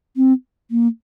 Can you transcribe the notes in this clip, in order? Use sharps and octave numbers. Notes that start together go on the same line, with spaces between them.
C4
A#3